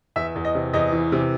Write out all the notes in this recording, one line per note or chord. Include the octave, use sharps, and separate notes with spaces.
E2 E5
E2
D#5
C3
E2 D#5
E3
C3